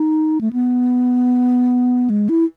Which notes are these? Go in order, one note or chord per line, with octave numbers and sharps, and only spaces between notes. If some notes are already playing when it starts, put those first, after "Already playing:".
Already playing: D#4
A3
B3
G#3
E4